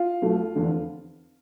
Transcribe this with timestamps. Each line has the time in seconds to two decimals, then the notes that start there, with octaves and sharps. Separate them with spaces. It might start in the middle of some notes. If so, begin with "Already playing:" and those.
Already playing: F4 F5
0.22 B1 B2 A3
0.55 F1 E2 D3